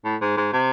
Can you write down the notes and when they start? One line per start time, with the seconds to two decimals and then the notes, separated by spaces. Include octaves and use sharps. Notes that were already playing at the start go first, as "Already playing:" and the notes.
0.05 A2
0.21 G#2
0.37 G#2
0.53 C3